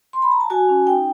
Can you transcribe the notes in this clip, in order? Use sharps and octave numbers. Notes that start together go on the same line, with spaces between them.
C6
B5
A#5
A5
F#4 G#5
C#4
D#4 G5